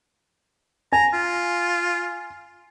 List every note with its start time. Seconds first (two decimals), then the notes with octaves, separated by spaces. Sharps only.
0.93 G#5 A#5
1.14 F4